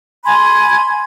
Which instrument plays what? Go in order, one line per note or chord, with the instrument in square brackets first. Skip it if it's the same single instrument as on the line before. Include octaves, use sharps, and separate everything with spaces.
[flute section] G#5 B5 C6 G#6